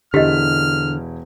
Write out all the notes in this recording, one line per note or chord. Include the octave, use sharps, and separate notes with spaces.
E1 D3 E4 G4 D#5 F6 B6